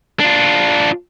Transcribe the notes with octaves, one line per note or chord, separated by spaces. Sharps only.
D4 F4